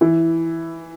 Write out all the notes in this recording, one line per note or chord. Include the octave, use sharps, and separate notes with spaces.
E3